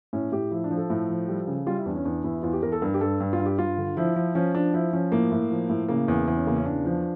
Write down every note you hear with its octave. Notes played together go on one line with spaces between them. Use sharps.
A2 C#4
A2 G4
F3 E4
D4
F3
A4
A2
F3
G3
C#3
G3 F4
E4
E2 D4
C#4
E2 D4
E2 E4
E4
E2 F4
G4
E2 A#4
A4
G2 A#4
G4
G2 A4
G2
F4
G2
G4
G2 F4
D3
F3 E4
F3
F3 C#4
F3 D4
F3 E4
F3 C#4
A2 A#3
A2
F3
A2
C#3 A#3
E2
E2
C#4
C#3 A#3
C#4
E2 D4
F3